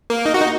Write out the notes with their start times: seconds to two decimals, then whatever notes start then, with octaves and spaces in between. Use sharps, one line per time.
0.10 A#3
0.26 D#4
0.34 F#4
0.41 D#4